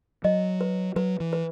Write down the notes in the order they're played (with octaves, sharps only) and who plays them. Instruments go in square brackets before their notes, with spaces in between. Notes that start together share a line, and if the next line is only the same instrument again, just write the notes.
[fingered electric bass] F#3 [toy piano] D#5
[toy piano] B4
[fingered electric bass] F#3 [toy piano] B4
[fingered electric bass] E3
[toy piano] B4